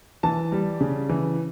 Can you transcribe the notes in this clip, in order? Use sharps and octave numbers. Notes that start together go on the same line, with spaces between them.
E3 A5
G3
C#3
E3